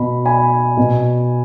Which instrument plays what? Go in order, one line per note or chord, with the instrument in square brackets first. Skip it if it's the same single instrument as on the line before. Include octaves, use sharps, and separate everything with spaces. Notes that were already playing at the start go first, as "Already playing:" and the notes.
Already playing: [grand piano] B2 B5
G#5 B5
B2